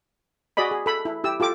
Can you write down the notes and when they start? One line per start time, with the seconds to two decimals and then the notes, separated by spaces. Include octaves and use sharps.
0.57 F#4 G#4 D5 D#5 B5
0.71 G#4
0.86 A4 B5
1.05 E4
1.24 E4 G4 E6
1.40 F4 G4 A4 D6